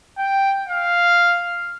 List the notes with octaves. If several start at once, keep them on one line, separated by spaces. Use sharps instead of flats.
G5
F5